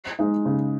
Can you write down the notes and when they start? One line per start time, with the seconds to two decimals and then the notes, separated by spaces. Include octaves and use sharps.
0.19 G#3 D#4
0.46 C#3